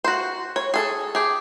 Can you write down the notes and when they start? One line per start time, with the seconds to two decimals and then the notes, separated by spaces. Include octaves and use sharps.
0.04 F#4 C5
0.56 C#5
0.74 G#4 A4
1.15 G4 G#4